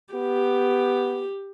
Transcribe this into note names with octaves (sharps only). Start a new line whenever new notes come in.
B3 G4